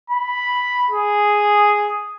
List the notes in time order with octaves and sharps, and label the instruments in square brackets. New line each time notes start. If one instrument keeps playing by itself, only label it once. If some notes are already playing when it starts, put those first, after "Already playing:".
[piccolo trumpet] B5
G#4